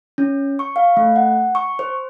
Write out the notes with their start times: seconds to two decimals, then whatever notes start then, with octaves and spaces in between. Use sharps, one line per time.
0.18 C#4
0.59 C#6
0.76 F5
0.97 A3
1.16 F#5
1.55 C#6
1.79 C5